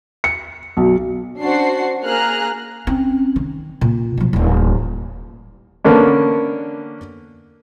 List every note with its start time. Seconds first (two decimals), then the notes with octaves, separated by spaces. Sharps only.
0.24 C#7
0.77 B1
1.39 C#4 D4 F#4 C5 F#5 C7
2.04 A#3 G#4 A#5 F6 F#6
2.87 C4 C#4
3.36 D#3
3.81 A#2
4.18 B2 F3
4.33 D#1 A1
5.85 D3 A#3 B3 C#4 D4